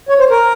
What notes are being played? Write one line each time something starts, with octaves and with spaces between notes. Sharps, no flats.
C#5
C5
A#4